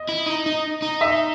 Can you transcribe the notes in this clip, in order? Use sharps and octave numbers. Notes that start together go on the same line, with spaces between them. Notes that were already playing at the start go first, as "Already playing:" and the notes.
Already playing: D#5
E4
D#4
D#4
D#4
E5